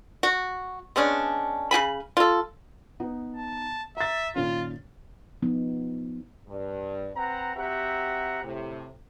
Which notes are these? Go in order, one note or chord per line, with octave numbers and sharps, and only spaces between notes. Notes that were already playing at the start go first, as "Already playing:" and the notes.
F#4
G#3 B3 C#4 D4
C#3 G4 G#5 B5
F4 A4
B3 D#4
A5
E5 A#5 A6
A#2 D#3 C#4 F4
F3 B3 D#4
G2
C4 B4 F#5 A#5
C4 F#4 G4 E5 F#5 A#5
A2 C3